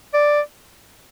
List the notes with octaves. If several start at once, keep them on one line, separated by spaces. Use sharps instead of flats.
D5